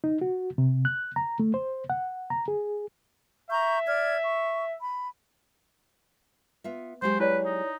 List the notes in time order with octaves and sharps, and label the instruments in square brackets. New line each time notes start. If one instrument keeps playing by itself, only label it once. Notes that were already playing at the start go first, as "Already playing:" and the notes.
[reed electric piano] D#4
F#4
C3
F#6
A#5
A3
C5
F#5
A#5
G#4
[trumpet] E5 [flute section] A#5 C#6 G6
[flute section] D5 F6 G#6
C#6
B5
[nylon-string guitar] B3 F4 E5
[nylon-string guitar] F#3 G#3 G4 [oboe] C5
[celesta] E4 C#5 D5 [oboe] B4
[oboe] D#4